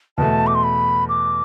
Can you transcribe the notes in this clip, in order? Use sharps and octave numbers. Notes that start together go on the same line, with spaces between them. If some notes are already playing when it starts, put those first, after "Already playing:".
E2 B2 A3 A5
D6
C6
B5
D6